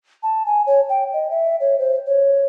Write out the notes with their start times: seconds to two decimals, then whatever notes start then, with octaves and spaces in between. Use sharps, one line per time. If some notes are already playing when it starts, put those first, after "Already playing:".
0.23 A5
0.46 G#5
0.67 C#5
0.89 G5
1.13 D#5
1.30 E5
1.60 C#5
1.79 C5
2.07 C#5